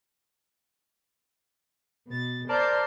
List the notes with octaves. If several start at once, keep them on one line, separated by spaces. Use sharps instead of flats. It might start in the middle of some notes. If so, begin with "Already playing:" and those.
B2 A6
A#4 C5 D5 A5 C6 G6